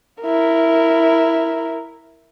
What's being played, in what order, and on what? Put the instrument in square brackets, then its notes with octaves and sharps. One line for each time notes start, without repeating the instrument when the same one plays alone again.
[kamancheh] E4 A#4